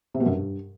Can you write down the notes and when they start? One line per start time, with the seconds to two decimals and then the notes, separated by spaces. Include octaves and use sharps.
0.14 C3
0.20 B2
0.26 F#2
0.32 G2